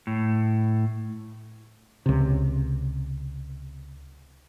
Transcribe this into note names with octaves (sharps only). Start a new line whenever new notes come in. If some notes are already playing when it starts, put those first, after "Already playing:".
A2
C#2 C3